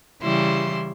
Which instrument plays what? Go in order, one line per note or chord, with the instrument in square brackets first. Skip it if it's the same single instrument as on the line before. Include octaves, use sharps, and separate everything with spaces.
[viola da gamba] C#3 G3 E4 [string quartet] E3 C6